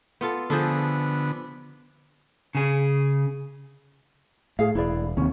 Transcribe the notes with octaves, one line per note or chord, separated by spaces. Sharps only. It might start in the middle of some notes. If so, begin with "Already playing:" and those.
B3 F4 A4
D3 F3 B3 G#4 A4
C#3 G#4
A2 G#4 F5
E1 E4 B4 D5
D#2 C3 C#4